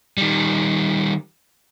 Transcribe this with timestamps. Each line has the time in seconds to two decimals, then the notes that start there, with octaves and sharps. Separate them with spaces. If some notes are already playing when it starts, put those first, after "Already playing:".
0.17 D#3 G3